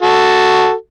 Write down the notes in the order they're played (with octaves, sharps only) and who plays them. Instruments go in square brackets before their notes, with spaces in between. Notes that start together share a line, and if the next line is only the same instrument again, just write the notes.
[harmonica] F#4 A4